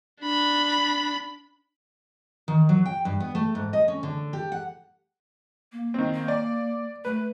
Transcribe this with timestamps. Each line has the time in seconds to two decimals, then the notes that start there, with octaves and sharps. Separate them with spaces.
0.22 D4 B5
2.48 D#3
2.69 F#3
2.86 G5
3.05 G2
3.20 B3
3.35 A3
3.55 G#2
3.73 D#5
3.88 C#4
4.03 D3
4.33 G4
4.52 F#5
5.72 A#3
5.94 D#3 C4
6.14 A#3
6.28 D5
7.05 A3 B4